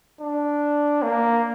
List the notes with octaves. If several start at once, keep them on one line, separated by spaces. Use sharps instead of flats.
D4
A#3